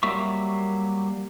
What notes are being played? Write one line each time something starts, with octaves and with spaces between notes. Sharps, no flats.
F#3 G3 A#3 E5 C#6